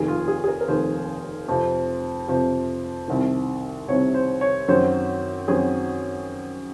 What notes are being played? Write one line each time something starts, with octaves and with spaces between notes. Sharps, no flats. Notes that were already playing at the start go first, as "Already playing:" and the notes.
Already playing: F1 D#2 D#3 G#4
F4
G#4
G#4
A#4
A#4
F1 D#2 D#3 C5
F2 C3 F3
F2 C3 F3
C2 C3 D#3
C2 C3 D#3 C#5
C5
C#5
F#2 D#3 F#3 C4 C5
F#2 D#3 F#3 C4 G#4